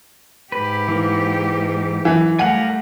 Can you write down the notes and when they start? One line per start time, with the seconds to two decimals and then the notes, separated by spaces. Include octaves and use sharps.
0.52 G#2 G4 B4
0.88 E3 A#3
2.05 F#2 E3
2.39 G3 A3 A#4 F5 F#5 G#5